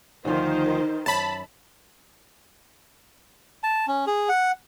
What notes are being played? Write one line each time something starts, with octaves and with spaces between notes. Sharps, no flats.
D2 D#3 F3 D#4 C5
F#2 A5 B5
A5
C#4
G#4
F#5